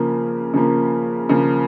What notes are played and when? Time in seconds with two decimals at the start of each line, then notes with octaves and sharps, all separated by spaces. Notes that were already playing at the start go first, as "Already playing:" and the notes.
Already playing: C#3 F3 A#3
0.54 C#3 F3 A#3
1.29 C#3 F3 A#3